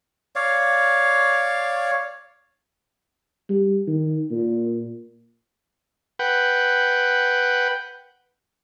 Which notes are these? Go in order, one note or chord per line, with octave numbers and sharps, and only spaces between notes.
C#5 D5 F5
G3
D#3
A#2
B4 F#5 G5